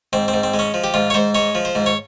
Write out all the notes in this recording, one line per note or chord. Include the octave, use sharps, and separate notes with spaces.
G#2 C4
C4
G#2
C4
G#3
C#4
F3
G4
G#2 F4
C#5
G#2 C5
G#3 C#5
F3
C5
G#2
C#5